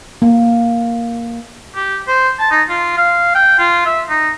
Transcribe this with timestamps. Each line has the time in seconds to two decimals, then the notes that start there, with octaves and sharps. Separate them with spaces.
0.22 A#3
1.75 G4
2.07 C5
2.39 A5
2.51 D#4
2.69 F4
2.97 F5
3.35 G5
3.59 F4
3.86 E5
4.09 D#4